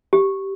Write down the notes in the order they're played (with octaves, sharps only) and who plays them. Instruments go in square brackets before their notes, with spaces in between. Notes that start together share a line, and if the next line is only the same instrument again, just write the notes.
[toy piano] G4